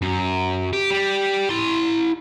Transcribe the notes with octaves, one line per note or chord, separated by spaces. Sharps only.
F#2
G4
G3
E4 C6